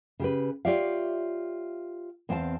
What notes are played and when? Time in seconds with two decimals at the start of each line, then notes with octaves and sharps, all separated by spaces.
0.19 C#3 G4 B4
0.65 F4 G4 C#5 D5 E5 F5
2.29 E2 C4 C5 F5 A5